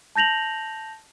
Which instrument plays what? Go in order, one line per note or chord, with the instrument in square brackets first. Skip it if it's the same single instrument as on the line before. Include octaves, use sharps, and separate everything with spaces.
[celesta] A5 G6 A#6 F7 F#7